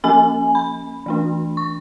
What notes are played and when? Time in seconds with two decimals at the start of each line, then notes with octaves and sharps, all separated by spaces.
0.04 F3 A#3 C#4 G#5
0.55 B5
1.06 E3 A3 D4
1.57 C#6